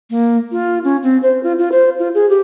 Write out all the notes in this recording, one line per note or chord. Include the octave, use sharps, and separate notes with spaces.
A#3
F4
C#4
C4
C5
F4
F4
C5
F4
G#4
G4